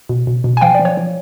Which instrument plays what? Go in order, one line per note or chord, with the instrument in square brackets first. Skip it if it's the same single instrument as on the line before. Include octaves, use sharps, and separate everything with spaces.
[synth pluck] B2
B2
B2
G#5
F3 F5 G5
F3 D5
C#5
F3